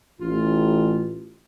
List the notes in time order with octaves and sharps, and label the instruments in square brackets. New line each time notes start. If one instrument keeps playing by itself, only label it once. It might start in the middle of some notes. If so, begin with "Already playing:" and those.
[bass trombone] A1 [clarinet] F4